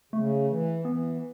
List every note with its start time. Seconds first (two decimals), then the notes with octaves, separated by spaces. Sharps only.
0.13 C#3 A3
0.48 E3
0.85 E3 B3